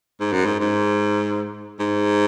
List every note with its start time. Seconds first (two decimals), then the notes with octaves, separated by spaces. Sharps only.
0.20 G#2
0.32 F#2
0.46 G#2
0.60 G#2
1.79 G#2